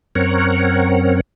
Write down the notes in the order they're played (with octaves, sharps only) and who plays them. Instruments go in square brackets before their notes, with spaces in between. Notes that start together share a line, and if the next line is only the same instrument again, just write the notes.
[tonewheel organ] F#2 C4 A#4 C#5 F#5